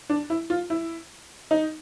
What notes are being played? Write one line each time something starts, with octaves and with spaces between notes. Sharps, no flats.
D4
E4
F4
E4
D#4